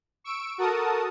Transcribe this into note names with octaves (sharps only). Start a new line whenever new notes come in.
C#6 E6 D7
F#4 A4 A#4 A5 D#6